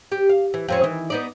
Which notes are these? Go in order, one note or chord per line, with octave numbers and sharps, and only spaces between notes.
G4
F5
E3
F2 C4 C#4
D#3 E3
B3 D#4 D5